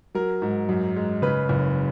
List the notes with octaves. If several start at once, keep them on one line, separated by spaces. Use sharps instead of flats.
F#3 A#4
G#2
F#2
G#3
C#3 B4
F#1